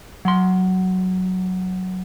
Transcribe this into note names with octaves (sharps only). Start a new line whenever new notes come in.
F#3 C6